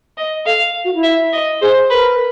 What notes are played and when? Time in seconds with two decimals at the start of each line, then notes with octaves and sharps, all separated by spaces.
0.18 D#5
0.46 A4 F5
0.84 F#4
0.94 E4
1.03 E5
1.33 D#5
1.61 G#4 C5
1.90 A#4 B4